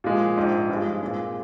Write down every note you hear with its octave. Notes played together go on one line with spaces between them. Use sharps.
A#2 F3 G#3
A#1 G#2 F3
G2 F3 G#3
A#2 G#3 C4